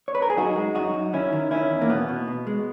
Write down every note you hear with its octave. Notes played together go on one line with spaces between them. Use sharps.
C#5
B4
A#4
G#4
F#2 D#4 F#4
G#3
F#2 D#4 F#4
F#2
D#3 C#4 E4
D#3
D#3 C#4 E4
E2
A#3
B2 B3
B2
B2
G#3